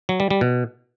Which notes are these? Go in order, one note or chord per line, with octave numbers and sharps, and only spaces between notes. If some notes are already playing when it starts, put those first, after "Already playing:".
F#3
G3
G3
B2